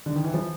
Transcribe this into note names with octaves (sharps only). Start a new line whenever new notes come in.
D3
D#3
E3
F3